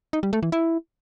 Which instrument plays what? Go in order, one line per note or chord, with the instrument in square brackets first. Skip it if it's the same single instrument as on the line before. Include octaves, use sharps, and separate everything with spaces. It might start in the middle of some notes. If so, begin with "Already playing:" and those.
[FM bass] D#4
G3
A3
E3
E4